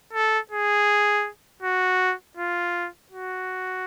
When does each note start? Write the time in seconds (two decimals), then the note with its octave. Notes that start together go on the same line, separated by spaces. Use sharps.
0.13 A4
0.51 G#4
1.62 F#4
2.37 F4
3.12 F#4